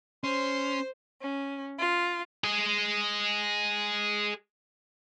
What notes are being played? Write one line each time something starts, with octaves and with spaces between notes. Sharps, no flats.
C#4 C5 C6
C#4
F4
G#4 D#5